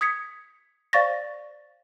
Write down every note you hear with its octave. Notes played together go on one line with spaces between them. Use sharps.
D#6 G#6 B6 C#7
C5 D5 F5 C#6 A6 A#6